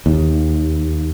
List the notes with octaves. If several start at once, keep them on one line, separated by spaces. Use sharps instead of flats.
D#2